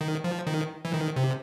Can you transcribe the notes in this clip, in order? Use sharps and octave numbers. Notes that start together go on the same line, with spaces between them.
D#3
F3
D#3
E3
D#3
C3